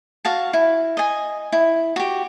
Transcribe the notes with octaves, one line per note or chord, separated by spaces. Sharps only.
F#4 F5 A5
E4
D#5 G#5
E4
F#4 G4